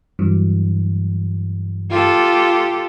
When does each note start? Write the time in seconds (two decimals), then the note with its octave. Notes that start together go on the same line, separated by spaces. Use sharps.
0.19 G2 E3 F#3
1.90 F4 G4 A4